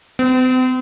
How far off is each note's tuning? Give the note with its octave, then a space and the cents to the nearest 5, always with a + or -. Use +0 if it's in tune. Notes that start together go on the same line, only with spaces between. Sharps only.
C4 -40